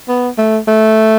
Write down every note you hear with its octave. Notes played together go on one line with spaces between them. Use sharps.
B3
A3
A3